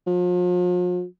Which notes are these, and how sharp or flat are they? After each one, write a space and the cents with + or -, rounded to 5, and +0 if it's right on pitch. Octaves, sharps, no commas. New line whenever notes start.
F3 +40